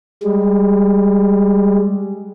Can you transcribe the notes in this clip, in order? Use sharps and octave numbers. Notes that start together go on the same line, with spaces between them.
G3 G#3